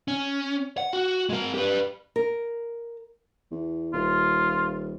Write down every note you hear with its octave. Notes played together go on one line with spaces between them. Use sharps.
C#4
F#5
F#4
G#3 A#4
G4 B4
A#4
E2
D#1 F4